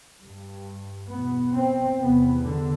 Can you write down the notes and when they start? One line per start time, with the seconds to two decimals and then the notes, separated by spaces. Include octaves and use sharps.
0.21 G2
1.09 E2 B2 B3
1.54 C4
1.97 E2 C3 B3
2.41 D3